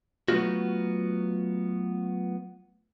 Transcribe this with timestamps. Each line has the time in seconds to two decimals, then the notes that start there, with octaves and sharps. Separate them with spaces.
0.28 F#3 A3 B3 C4 F4 F#4